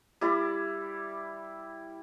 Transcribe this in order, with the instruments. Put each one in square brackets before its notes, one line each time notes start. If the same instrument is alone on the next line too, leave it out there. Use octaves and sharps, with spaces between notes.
[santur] G3 E4 D5